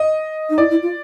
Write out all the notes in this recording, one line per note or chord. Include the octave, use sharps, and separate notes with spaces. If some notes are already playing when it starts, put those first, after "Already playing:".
Already playing: D#5
D#4
E4 D5
E4
F4